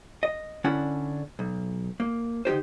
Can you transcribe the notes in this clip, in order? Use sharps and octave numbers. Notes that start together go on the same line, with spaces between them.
D#5
D3 C#4 D4 E4 F#5
B1
A#3
D3 D#4 G4 C5